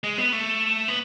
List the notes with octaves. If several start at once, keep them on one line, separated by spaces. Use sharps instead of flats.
G#3
B3
A3
B3